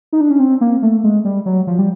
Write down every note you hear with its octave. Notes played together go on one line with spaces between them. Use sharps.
D#4
D4
C#4
C4
A#3
A3
G#3
G3
F#3
F3
G3